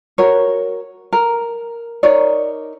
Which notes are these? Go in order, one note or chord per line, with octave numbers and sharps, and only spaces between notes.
F#4 A#4 C#5
A#4
D#4 A#4 C#5 D5